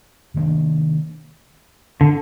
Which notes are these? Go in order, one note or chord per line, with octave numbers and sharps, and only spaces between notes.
C3 D#3 A#3 D4
D3